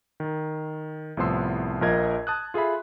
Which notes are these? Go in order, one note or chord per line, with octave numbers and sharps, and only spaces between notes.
D#3
C2 A2 F3 B3 C6 E6
A#1 F3 F4 A#4 D#5 G#6
A5 D#6 F#6
F4 G#4 A4 E5 B5